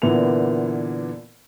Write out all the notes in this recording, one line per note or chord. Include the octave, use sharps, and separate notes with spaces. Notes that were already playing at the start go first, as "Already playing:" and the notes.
A#2 D3 E3 B3 A#4 F7